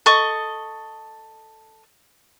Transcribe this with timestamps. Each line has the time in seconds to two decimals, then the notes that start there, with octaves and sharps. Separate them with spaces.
0.06 A4 D#5 C#6 D#6